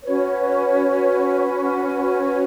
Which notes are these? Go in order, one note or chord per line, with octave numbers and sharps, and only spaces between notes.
C#4 F#4 B4 C#5
C#5